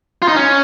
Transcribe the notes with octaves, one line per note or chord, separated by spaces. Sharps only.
F4
D#4
C#4